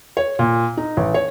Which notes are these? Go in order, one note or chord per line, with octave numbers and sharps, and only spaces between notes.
C#5
A#2
D#4
A1
C#5